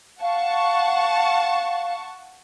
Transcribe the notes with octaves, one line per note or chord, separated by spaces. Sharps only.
F5 F#5 A5 C#6